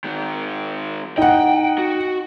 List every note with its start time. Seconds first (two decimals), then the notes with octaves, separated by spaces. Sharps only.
0.04 D#3 G#3
1.18 D#4 F#5 G5
1.78 F#4